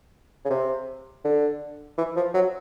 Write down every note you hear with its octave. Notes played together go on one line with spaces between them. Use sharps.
C#3
C3
D3
E3
F3
F#3